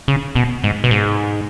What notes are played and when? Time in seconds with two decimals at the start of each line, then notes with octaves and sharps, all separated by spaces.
0.08 C#3
0.35 B2
0.64 G#2
0.84 B2
0.91 G#2